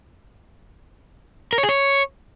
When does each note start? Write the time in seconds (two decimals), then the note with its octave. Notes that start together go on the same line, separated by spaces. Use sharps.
1.53 A#4
1.58 C#5
1.63 G#4
1.69 C#5